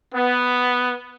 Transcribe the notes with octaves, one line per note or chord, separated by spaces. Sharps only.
B3